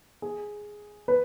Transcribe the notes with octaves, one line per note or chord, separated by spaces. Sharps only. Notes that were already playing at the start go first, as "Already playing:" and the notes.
G#4
B4